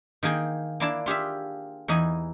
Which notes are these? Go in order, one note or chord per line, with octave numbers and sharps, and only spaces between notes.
D#3 A#3 G#4 G5
A#3 D4 E4 D5 A5
F4 G4 G#4 E5
E2 E3 D#4 D#5 G#5